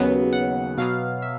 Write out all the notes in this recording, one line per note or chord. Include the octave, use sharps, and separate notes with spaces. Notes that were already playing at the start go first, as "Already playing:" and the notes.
Already playing: D#2 C#3 F#3 B3
F#5
B2 F#3 B3 F5
E5